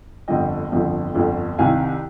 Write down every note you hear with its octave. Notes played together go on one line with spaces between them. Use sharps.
G1 F2 D3 F3 D#5 G5
G1 F2 D3 F3
G1 F2 D3 F3
C2 C3 D#3 F5 G#5